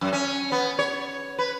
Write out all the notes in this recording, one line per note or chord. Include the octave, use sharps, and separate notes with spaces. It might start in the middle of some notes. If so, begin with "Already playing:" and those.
F#2
C#4
B3
C#5
B4